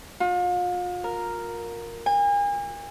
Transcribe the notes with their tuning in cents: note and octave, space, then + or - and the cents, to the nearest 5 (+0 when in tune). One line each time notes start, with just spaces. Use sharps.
F4 +40
A#4 +0
G#5 -40